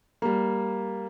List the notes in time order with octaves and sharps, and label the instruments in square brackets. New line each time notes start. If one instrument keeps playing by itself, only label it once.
[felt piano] G3 A#3